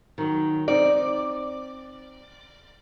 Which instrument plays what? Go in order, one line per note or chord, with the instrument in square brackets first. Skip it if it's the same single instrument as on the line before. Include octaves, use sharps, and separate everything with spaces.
[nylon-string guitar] D#3 F#3
[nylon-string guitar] C4 D#4 [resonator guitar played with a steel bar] D5